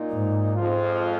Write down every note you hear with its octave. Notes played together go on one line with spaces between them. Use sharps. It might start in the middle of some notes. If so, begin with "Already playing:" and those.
Already playing: A#2 A#3 D#4
G#2
F2 F3 G#3 F4